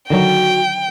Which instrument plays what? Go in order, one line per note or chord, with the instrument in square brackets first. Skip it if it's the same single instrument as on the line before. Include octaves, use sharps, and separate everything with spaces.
[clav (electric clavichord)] D3 D#3 F#3 [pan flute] F#4 [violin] G5